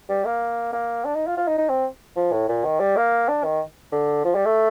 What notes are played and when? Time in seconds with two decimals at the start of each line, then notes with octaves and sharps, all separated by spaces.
0.09 G3
0.25 A#3
0.73 A#3
1.05 D4
1.15 D#4
1.26 F4
1.37 F4
1.47 D#4
1.58 D#4
1.69 C4
2.16 F3
2.32 A2
2.49 A#2
2.65 D#3
2.80 G3
2.97 A#3
3.28 D4
3.44 D#3
3.92 D3
4.24 F3
4.35 G3
4.46 A3